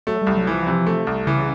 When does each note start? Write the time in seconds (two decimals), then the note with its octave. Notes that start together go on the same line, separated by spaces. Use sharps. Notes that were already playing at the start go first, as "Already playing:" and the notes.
0.07 F#3 A3
0.22 C2 G3
0.37 F#3
0.47 E3 F3
0.67 C3
0.86 A3
1.07 C2
1.27 C#3 E3